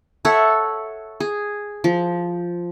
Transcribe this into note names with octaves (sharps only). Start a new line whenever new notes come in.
A4 C#5 E5 F#5
G#4
F3